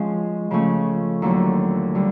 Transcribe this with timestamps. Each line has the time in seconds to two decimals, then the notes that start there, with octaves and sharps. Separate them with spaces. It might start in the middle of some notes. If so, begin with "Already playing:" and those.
Already playing: F3 G#3 C#4 G#4
0.51 C#3 F3 A3 C#4
1.22 D#2 D3 F#3
1.95 D3 G3